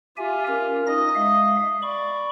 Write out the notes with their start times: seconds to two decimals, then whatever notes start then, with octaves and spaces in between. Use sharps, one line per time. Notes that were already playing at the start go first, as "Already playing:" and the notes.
0.17 F4 G4 E5 G#5
0.47 C#4 A#4
0.87 D#4 D#5 A#6
1.15 G#3 E5 F5
1.82 D5 B5 C#6